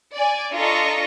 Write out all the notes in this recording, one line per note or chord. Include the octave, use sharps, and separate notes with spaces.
D5 G#5
D4 F4 A4 D#5 A#5 C#6